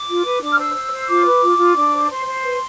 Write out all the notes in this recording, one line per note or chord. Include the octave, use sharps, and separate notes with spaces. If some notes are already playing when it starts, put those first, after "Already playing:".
Already playing: D6
F4
B4
D4 D6
F6
C5 E6
C5
C5
F4 D6
B4
F4
F4
D4
C5
C5 C6
C5
B4